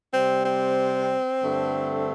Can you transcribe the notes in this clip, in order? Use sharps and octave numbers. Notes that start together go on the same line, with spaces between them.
C3 G3 C4
C4
G2 D3 A3